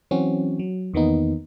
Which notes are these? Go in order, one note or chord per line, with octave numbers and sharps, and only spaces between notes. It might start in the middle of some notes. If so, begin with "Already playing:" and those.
E3 F#3 C4 C#4 F#4
F#3
E2 D#3 A#3 B3 D#4